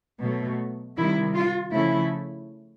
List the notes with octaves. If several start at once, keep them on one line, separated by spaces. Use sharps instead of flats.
B2 F#3 A3
C3 D#3 G3 E4
F4
C#3 F3 A3 E4